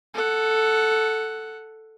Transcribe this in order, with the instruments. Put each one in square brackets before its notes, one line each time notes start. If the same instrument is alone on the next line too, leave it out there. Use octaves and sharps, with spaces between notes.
[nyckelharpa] A4 F#5